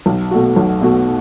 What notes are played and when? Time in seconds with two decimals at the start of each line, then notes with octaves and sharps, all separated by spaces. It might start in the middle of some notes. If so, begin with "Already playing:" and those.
0.06 B1
0.31 B2 A3 F#4
0.56 B1
0.81 B2 A3 F#4